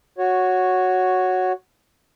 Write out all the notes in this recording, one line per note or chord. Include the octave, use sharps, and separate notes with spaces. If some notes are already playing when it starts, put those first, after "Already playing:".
F#4 C#5